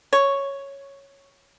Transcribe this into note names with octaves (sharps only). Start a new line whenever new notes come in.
C#5